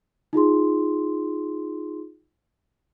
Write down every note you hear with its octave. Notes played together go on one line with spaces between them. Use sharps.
D#4 F4 G#4 C6